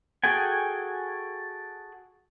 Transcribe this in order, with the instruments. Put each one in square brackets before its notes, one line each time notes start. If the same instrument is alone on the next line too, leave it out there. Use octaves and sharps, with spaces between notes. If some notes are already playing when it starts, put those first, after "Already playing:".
[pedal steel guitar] F#4 G#4 A4 G5 G#5